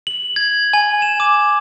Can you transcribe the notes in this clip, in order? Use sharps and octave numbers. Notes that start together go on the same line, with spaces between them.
F#7
G#6
G#5
E7
D6